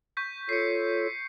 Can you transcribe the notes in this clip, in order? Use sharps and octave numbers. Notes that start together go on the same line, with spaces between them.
C#6 G6 B6
F4 A4 C#5 C7 C#7